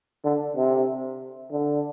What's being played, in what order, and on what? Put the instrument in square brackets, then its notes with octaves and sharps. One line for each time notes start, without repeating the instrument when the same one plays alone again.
[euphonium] D3
C3
D3